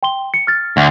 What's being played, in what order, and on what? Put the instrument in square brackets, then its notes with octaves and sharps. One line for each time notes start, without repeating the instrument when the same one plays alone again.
[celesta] G5 C6 G7
C#7
F6 A6
[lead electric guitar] D2